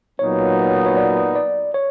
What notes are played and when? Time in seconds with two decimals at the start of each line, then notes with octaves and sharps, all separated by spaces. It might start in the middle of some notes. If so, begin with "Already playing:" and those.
0.19 A#2 F#3 B3 D#4 C#5
0.86 C#5
0.97 D5
1.36 D5
1.74 C#5